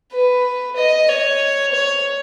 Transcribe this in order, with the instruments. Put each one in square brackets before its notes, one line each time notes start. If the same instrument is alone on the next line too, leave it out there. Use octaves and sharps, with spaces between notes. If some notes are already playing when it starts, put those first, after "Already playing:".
[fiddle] B4
D#5
C#5
C#5